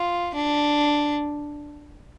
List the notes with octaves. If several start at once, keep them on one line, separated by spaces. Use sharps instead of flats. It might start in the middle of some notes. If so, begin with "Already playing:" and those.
Already playing: F4
D4